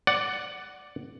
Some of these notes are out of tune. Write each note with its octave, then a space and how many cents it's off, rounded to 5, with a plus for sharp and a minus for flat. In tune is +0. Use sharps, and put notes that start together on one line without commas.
D5 +0 F#5 +10